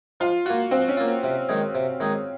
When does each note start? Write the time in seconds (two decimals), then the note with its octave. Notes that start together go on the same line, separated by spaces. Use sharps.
0.20 F3 F4
0.46 A#3 F4 F#4
0.71 F3 C4
0.88 C#4
0.97 A#3 F4
1.24 C3
1.49 D#3 G#3 D#4 G#4
1.75 C3
2.00 D#3 G#3 D#4 G#4